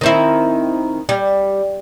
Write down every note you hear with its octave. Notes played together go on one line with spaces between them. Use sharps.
D#3 C4 E4
G3